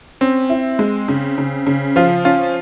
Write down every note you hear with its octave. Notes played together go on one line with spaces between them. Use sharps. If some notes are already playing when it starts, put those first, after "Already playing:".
C4 C#4
E4
G#3
C#3
C#3
C#3
F3 F4
C#4 F4